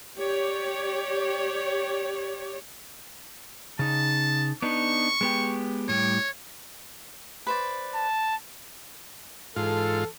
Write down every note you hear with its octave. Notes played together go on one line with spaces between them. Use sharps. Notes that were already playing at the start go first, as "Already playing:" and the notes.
G4 C#5 D5
C#3 D#4 A5
B3 D4 D#4 C#6
G#3 B3 G4
A2 G3 C#5
B4 C5 D5
A5
G#2 E3 F4 A4